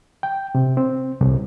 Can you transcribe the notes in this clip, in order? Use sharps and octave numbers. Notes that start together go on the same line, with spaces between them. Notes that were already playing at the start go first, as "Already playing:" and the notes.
G5
C3
C4
C2